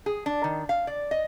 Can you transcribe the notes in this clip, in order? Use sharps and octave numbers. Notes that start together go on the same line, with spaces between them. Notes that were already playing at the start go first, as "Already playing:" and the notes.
G#4
D4
D#3
F5
D5
D#5